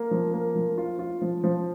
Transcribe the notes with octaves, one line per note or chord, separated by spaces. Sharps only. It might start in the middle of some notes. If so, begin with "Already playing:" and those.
Already playing: A#3
F3
A#3
F3
F4
F4
F3
F3